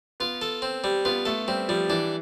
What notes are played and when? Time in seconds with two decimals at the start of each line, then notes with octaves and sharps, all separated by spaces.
0.20 B3 F4
0.41 A4
0.62 C4
0.84 G3
1.05 B3 F4
1.25 A3 A4
1.48 G3 C4
1.68 F3 G3
1.89 E3 D4